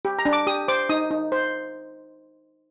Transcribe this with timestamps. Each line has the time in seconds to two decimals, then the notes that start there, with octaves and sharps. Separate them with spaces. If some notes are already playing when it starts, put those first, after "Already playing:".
0.05 G4
0.19 A#5
0.25 D4
0.33 D6
0.47 G4 D#6
0.68 C5 D6
0.89 D#4 D#6
1.11 D#4
1.32 C5